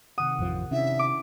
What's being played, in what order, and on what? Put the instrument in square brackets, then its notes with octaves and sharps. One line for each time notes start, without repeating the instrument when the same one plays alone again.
[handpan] C3 D#3 F#5 [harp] D#6
[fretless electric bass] A1 F2 F3
[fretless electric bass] C3 [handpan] C#4 D4 E4 [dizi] E5
[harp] D6